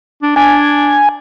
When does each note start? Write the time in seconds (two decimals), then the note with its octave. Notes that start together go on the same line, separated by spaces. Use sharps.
0.23 D4
0.36 D4 G#5